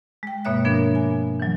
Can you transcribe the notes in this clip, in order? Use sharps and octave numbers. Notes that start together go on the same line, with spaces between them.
G#3 G5
G2 B2 A#3 C#5 E5 F#6
F3 B3 D4 A#4
G#5
E3 F#3